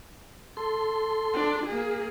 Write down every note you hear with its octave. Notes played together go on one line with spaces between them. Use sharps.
A4 C6
D4
A#3 G#4